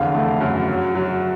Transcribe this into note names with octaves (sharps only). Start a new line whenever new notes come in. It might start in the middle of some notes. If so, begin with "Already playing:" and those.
Already playing: F1 E2 D3 F5
A3
F#2
F#3
F#3